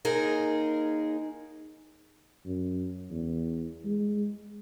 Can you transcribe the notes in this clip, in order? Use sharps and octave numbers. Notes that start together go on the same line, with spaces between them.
D#2 D#4 G#4 A#4
F#2
E2
G#3